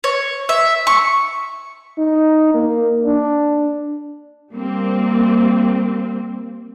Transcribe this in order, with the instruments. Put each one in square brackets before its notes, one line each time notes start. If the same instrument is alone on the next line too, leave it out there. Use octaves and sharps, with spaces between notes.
[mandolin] C#5
E5
C#6
[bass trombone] D#4
A#3
D4
[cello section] G3 A#3 C4